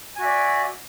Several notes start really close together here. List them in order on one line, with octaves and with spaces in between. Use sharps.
G#5 F#4 E5 D5